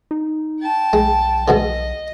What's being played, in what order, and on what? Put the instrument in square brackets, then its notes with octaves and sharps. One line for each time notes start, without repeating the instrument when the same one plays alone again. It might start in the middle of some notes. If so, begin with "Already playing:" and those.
[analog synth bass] D#4
[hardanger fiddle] G5 A5
[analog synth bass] B1 [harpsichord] G#3
[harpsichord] G#2 B2 D3 [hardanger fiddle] D#5